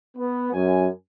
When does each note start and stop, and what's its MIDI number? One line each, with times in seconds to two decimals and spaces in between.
0.17 0.51 59
0.53 0.87 42
0.53 0.87 80